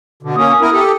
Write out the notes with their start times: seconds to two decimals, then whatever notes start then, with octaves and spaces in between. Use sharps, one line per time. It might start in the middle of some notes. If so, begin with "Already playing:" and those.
0.23 B2 D3
0.36 A#3 C#4 D#6
0.61 B3 E4 A#4
0.73 G4 A4